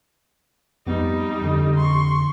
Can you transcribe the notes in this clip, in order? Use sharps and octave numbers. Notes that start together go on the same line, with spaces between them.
F2 G3 B3 D#4
F2 D3
C6 C#6